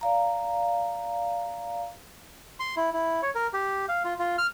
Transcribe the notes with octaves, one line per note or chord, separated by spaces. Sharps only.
D5 F5 A#5
C6
E4
E4
C#5
A#4
G4
F5
F4
F4
F6